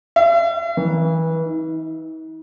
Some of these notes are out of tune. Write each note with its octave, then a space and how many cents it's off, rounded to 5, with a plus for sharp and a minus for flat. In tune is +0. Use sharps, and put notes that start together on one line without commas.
E5 +45
E3 -25
D#4 +45